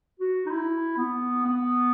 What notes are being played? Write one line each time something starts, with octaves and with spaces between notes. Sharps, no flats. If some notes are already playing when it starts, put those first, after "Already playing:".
F#4
D#4
E4
B3
B3